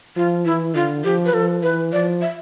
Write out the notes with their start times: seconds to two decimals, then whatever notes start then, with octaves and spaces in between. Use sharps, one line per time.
0.16 F3 F4
0.45 E3 E4
0.75 D3 F4
1.04 F3 G4
1.26 B4
1.33 F3 A4
1.63 E3 B4
1.92 F3 D5
2.21 E5